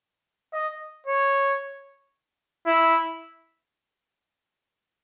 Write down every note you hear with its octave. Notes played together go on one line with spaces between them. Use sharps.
D#5
C#5
E4